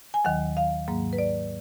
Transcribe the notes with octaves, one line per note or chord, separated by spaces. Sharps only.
G#5
D#2 D#3 F#3 F#5
F5
G#2 F#3 A#3
B4
D5